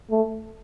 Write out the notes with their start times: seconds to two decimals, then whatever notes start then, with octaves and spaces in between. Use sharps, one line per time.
0.10 A3